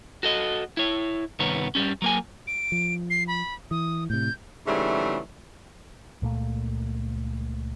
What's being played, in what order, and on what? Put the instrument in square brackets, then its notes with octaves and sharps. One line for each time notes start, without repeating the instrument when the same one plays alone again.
[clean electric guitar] F#4 A4 D#5
E4 C#5
C2 G2 D#3 B3 C#5
G2 B2 G3 C#4
F#3 A#3 G#5
[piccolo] D7
[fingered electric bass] F3
[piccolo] C7
B5
[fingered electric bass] E3 [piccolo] D#6
[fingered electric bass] A2 C3 [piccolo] G6
[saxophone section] G#2 C#3 E3 F#3 G3 A3
[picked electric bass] C#2 A#2 A3 A#3